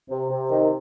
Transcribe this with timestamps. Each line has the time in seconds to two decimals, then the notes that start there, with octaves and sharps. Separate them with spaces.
0.09 C3
0.30 C3
0.50 D#3